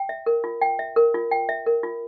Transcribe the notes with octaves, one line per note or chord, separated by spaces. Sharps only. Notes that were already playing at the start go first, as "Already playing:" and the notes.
Already playing: G5
E5
A#4
F4
G5
E5
A#4
F4
G5
E5
A#4
F4